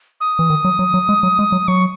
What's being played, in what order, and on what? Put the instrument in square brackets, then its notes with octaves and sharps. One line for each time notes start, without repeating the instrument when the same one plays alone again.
[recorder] D#6
[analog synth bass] E3
D#3
F#3
F#3
F#3
G#3
F#3
G#3
F#3
[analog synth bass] F#3 [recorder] C#6